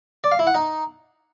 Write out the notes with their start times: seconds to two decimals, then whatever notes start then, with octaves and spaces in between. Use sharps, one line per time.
0.24 D5
0.32 F5
0.39 E4
0.47 F#5
0.55 D#4